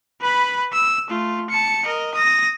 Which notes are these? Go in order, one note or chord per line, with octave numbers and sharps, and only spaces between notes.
B4 B5
E6
A3 F4
A5 C#7
A#4 D#5
D#6 A#6